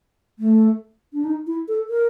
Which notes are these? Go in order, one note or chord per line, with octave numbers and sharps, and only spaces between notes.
A3
D4
D#4
E4
A4
A#4